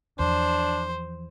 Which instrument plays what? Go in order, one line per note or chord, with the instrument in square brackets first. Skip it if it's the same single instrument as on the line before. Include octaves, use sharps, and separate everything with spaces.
[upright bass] E2 F3 [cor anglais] D4 [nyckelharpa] C5